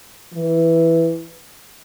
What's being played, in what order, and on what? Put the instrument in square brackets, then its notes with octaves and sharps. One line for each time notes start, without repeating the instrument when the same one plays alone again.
[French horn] E3